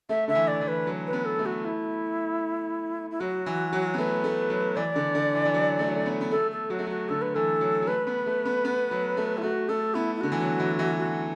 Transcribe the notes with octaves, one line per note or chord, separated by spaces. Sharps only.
A3 E5
D3 E5
E3
D5
E3
B4
F#3
B4
B3
A4
A3
F#4
E4
E4
F#3 F#4
E3
F#3
B3
A3 B4
A3
F#3
E3 D5
D3
D3
E3
E3
F#3
A3
F#3
A3
B3
B3
A3 A4
A4
F#3 F#4
A3
F#3
F#4
D3 A4
B4
E3 A4
F#3
F#3
A3 B4
B3
A3
B3
B3
F#3
A3
E4
A3 F#4
A3 A4
B3 E4
E4
D3 F#4
E3
F#3
E3
E3
F#4